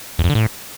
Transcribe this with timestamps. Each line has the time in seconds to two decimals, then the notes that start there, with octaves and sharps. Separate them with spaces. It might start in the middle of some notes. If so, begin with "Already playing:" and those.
0.19 E2
0.24 F2
0.30 D3
0.35 A2